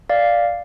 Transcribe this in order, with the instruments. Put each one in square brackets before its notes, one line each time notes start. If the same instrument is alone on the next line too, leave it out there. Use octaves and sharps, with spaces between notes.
[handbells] D5 F5